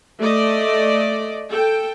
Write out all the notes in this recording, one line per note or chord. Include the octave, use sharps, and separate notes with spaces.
A3 D5 D#5
A4 G5